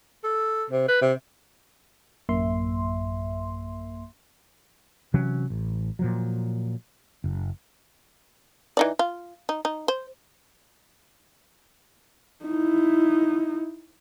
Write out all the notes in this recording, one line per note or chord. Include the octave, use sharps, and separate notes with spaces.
A4
C3
B4
C3
A1 F#2 A#3 E5 C6
C3 E3 F#3 C#4
A1
A#2 F3 F#3
F#1
E3 D#4 D5
F4
D#4
D#4
C5
D#4 E4